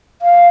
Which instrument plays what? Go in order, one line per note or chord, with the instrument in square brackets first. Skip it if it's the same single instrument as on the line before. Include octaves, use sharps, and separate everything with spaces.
[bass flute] F5